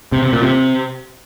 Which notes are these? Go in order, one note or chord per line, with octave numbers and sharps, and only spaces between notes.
C3
C3
A#2
C3